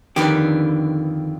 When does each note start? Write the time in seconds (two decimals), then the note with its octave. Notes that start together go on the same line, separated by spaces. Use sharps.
0.16 F2 D3 D#3 G4 B4